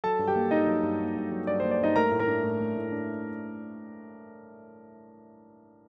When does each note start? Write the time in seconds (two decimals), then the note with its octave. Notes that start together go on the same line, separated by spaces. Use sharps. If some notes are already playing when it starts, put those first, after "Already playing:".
0.04 F#3 A4 A5
0.19 G2
0.28 G4 G5
0.36 A#3
0.51 G2 D#4 D#5
0.67 F#3
0.83 G2
1.00 A#3
1.16 G2
1.32 F#3
1.47 G2 D5
1.60 A#3 C5
1.71 D5
1.81 G2 D#4 D#5
1.96 A3 A#4 A#5
2.12 A2
2.19 A#4 A#5
2.28 D4
2.44 A2
2.60 A3
2.77 A2
2.92 D4